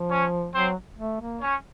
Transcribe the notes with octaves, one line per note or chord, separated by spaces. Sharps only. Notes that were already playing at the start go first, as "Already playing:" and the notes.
Already playing: F3
C#4 C#5
F#3 C4 C5
A3
A#3
C#4 C#5